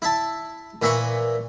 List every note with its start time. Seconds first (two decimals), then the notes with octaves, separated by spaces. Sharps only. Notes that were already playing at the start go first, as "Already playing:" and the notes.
0.02 E4 E5 A5
0.82 A#2 E3 E5 B5 C#6